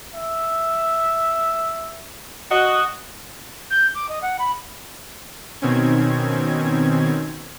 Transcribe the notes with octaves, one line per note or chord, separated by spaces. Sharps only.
E5
F#4 D#5
G6
D6
D#5
F#5
B5
B2 D#3 C4 C#4 G#6